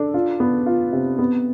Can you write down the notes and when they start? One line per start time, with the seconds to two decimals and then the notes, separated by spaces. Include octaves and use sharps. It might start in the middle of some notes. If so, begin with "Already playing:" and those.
Already playing: D4 A4
0.14 F4
0.40 B3
0.66 F4
0.93 C3
1.19 B3